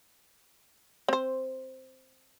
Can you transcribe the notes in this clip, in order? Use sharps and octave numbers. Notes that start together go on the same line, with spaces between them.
C4 C5